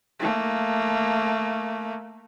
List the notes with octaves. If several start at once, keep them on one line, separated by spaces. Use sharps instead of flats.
A3 A#3